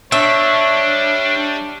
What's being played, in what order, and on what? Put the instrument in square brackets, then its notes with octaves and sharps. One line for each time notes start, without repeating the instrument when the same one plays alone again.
[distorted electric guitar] G3 [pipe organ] D4 [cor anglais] C#5 [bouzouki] E5